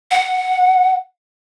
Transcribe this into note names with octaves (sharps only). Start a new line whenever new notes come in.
F#5